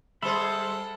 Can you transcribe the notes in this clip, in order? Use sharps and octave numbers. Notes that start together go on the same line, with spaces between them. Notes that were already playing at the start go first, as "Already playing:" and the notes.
G3 G#4 A4 C5 E5 F#5 B5 C6